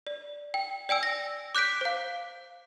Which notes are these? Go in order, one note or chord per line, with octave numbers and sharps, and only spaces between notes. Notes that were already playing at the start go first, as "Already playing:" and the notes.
D5
G5
D5 G5 G#5 E6
A#6
D6 F#6 G6 B6 D7
C5 F5